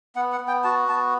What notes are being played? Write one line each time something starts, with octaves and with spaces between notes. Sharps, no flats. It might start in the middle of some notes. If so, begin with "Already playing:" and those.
B3 F#5
F#5
B3
G5
F#4 A5
B3 A5